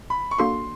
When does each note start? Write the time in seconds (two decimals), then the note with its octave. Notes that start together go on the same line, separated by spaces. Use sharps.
0.10 B5
0.31 C#6
0.38 A#3 D4 F#4 A4 C6